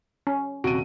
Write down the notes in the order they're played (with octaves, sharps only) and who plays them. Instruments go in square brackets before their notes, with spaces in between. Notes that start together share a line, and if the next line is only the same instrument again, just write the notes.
[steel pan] C#4
[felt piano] D#1 C3 D7 [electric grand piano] F#4 D#7